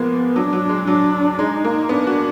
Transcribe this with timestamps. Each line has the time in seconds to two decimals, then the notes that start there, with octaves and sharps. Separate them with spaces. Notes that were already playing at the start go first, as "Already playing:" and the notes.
Already playing: F3 G#3 A#3 B3
0.35 F#3 D4
0.53 F#3
0.69 G#3
0.87 F#3 D4
1.38 G#3 D#4
1.64 A#3
1.89 B3 D4
2.07 F#4